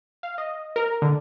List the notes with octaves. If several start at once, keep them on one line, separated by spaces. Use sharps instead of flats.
F5
D#5
A#4
D3